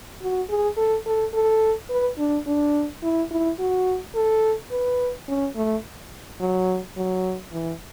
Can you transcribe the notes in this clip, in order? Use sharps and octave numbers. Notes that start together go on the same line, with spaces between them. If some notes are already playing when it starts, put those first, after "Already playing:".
F#4
G#4
A4
A4
A4
B4
D4
D4
E4
E4
F#4
A4
B4
C#4
A3
F#3
F#3
E3